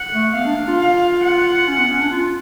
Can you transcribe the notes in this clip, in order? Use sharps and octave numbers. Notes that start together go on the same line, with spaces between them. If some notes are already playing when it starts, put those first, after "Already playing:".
Already playing: F#5
A3
B3 F5
D4
D4
F4
F5
F#5
C#4
B3
C#4
D4
F4